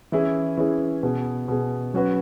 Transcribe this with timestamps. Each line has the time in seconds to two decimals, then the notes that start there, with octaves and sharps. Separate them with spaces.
0.12 E3 C#4 E4 G#4
0.57 E3 C#4 E4 G#4
1.03 B2 B3 G#4
1.48 B2 B3 G#4
1.94 F#3 C#4 F#4 B4